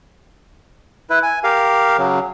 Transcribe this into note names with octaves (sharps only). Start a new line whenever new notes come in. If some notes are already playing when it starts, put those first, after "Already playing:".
E4 B4
G#5
G4 A#4 F5
C#3 F#3